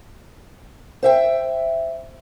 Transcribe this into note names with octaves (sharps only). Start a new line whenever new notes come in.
C5 E5 G5